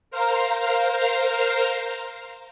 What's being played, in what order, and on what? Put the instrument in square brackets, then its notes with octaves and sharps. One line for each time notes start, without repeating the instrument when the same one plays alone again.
[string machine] A#4 C5 F5 A#5